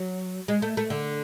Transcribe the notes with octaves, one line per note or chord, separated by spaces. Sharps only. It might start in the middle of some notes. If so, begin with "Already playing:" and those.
Already playing: F#3
G#3
A3
A3
D3